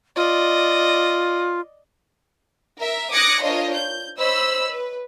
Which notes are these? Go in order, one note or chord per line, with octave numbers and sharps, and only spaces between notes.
F4 D5 D#5
A#4 E5
D6 D#6 F#6 G#6 A#6 C#7
D4 F4 A#4 C5 C#5 D#5
G6
C5 C#5 D#5 B5 E6
B4